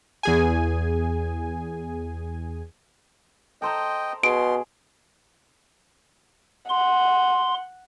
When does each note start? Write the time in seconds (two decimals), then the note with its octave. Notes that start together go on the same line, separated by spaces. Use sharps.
0.23 E2 G#4 G#5
3.62 A4 C5 D#5 G5 A#5
4.23 B2 G#4 C6 D7
6.69 F#5 C6